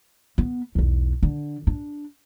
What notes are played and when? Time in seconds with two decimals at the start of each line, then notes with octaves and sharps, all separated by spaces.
0.38 B3
0.75 B1 E2
1.23 D3
1.67 D4